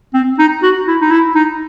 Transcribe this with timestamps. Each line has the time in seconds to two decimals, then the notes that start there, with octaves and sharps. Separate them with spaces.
0.14 C4
0.39 D#4
0.63 F#4
0.88 E4
1.01 D#4
1.11 E4
1.35 D#4